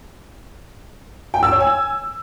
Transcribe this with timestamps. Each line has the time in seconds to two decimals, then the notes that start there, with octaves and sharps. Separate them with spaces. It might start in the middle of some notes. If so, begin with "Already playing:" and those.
1.34 G5
1.43 E6
1.52 C#5
1.60 G#5